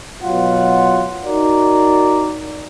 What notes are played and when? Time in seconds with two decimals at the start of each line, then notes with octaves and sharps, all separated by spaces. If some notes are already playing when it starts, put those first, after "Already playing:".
0.23 B2 F#3 F4 F#5
1.24 D#4 F#4 A#4 D5